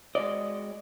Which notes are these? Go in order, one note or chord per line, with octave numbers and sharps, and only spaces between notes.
G#3 F#4 D5 D#5